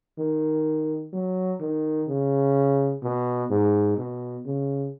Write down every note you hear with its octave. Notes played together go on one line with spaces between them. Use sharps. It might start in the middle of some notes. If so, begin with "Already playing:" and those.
D#3
F#3
D#3
C#3
B2
G#2
B2
C#3